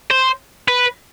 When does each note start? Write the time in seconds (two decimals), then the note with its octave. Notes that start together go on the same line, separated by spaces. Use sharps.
0.11 C5
0.68 B4